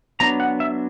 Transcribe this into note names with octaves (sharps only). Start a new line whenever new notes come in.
F#3 B3 D4 A#5
F#5
E5